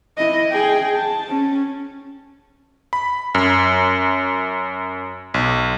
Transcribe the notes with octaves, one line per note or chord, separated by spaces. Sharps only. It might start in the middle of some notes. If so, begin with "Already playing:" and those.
E4 D#5
G#4 G5
A5
C#4
B5
F#2
B1